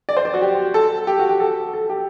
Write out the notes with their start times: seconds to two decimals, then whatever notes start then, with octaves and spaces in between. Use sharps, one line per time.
0.09 D5
0.17 C5
0.25 D5
0.34 F#4
0.41 G4
0.74 A4
1.07 G4
1.19 F#4
1.29 G4
1.40 A4
1.74 A4
1.90 G4